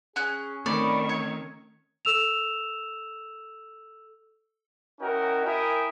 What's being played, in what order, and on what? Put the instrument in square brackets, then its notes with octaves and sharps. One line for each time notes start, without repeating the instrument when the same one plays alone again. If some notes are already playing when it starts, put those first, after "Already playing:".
[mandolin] C#4 F#6 [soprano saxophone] G#4
[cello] D#3 [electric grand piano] A3 C4 C#4 [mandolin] D5 B5 [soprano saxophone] C#6
[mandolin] C#5
[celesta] A4 E6 E7 F7
[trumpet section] C#4 E4 F#4 A#4 D#5 G5
E4 A#4 E5 G5 G#5 D#6